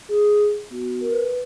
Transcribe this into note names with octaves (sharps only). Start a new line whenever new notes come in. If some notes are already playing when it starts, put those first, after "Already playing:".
G#4
B3 D#4 F#4
A#4
B4